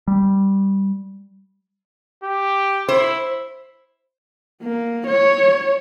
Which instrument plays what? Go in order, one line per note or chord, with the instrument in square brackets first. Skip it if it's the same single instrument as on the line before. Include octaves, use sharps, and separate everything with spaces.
[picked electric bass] G3
[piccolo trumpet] G4
[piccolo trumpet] E4 [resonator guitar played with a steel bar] C5
[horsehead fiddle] A#3
C#5